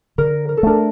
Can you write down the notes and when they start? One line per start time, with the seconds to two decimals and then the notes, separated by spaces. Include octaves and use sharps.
0.18 D3 A#4
0.49 A#4
0.57 A4
0.63 A3 D4 A#4